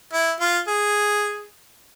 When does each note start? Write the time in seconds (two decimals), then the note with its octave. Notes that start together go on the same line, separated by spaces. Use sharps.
0.13 E4
0.40 F4
0.68 G#4